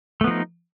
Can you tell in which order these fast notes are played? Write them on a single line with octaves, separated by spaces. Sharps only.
A3 B3 F3 D#4